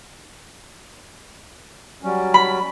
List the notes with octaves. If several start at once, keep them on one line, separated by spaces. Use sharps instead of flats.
F#3 G3 C#4
B5